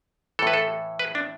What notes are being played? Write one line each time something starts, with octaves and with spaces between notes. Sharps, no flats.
A2 E3 A4 B4
A4
B4
D4